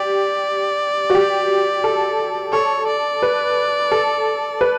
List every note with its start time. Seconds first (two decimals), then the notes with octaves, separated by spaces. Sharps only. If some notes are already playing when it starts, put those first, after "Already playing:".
Already playing: G4 D5
1.10 F#4
1.15 G4
1.84 A4
2.53 A4 C#5
2.88 D5
3.22 B4
3.91 A4
4.61 B4